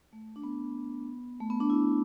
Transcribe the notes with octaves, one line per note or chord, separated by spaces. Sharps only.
A3
D4
B3
A3
B3
D4
E4